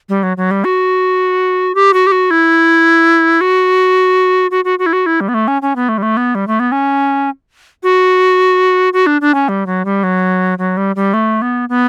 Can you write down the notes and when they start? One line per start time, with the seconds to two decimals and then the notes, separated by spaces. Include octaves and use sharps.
0.09 G3
0.23 F#3
0.37 F#3
0.51 G3
0.64 F#4
1.75 G4
1.93 F#4
2.07 G4
2.12 F#4
2.31 E4
3.41 F#4
4.51 F#4
4.65 F#4
4.79 F#4
4.86 E4
4.93 F#4
5.06 E4
5.21 G3
5.29 B3
5.34 A3
5.48 C#4
5.62 C#4
5.76 B3
5.89 A3
5.98 G3
6.03 A3
6.17 B3
6.35 G3
6.48 A3
6.60 B3
6.72 C#4
7.83 F#4
8.93 F#4
9.07 D4
9.21 D4
9.34 C#4
9.49 G3
9.66 F#3
9.85 G3
10.03 F#3
10.58 F#3
10.77 G3
10.96 G3
11.14 A3
11.42 B3
11.69 B3